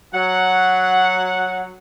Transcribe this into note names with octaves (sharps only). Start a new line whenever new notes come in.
F#3 F#5